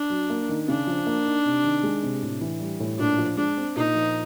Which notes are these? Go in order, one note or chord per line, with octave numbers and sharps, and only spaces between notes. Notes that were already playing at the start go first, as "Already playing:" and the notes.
Already playing: D4
F#3
A#3
D#3
C#3 D4
F3
A#3
D#4
C3
D#3
G#3
C3
A2
E3
G3
A2
A#2 D4
F3
G#3 D4
C4
A#2 D#4
F3